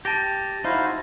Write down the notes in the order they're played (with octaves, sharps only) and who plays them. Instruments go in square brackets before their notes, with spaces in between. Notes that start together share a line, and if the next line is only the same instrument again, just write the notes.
[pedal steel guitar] G4 G5 [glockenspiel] A5 A6 A#6
[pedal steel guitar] D#4 F#4 [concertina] E4 C5 F5